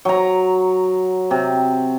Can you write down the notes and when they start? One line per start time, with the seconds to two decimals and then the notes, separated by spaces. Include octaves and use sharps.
0.05 F#3 A#5
1.31 C3